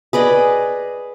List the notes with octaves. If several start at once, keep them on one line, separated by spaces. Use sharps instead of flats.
G#4 B4 D5 D#5